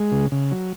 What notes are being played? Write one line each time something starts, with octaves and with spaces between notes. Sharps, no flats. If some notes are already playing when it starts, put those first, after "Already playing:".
Already playing: G#3
C#3
C#3
F#3